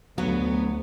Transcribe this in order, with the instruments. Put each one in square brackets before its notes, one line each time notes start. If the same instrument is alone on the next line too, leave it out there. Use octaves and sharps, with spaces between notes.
[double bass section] D2 [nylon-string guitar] F#3 F#4 [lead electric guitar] B3